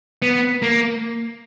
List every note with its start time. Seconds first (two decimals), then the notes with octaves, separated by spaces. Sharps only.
0.22 B3
0.62 A#3